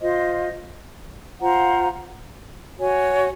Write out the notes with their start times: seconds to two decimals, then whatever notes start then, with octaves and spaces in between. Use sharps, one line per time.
0.01 F4 C5 D#5
1.39 F4 C5 F#5 A#5
2.79 F#4 C#5 G#5